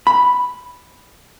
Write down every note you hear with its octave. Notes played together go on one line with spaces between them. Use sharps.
B5